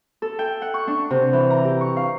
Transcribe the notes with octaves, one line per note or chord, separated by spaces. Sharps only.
A4
G5
F#5
C#6
D4
C3
E3
A#5
G4
C#6
F5